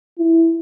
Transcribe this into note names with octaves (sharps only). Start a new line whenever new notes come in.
E4